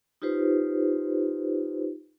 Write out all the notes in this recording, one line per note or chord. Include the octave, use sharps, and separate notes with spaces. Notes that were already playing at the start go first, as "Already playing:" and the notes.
D#4 F4 G4 B4 C5